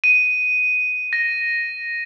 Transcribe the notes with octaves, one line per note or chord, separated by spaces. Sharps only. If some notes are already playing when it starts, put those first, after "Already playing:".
D#7
A#6